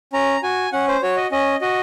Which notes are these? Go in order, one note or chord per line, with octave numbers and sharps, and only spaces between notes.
C#4 A#5
F#4 G#5
C#4 F#5
C5
F#4 C#5
D#5
C#4 D#5
F#4 D#5